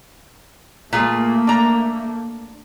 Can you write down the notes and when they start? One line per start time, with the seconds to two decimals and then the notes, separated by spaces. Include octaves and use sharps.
0.93 A#2 A3 A#3 F4 G#4
1.47 D4 A#5